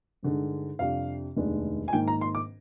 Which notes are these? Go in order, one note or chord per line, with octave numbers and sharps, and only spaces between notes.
G2 D3 G#3 D#4
F2 C3 G3 D4 F5
F1 D#2 D#3 G#3 D4
G#5
G#2 D#3 A#3 G5
A#5
C6
D6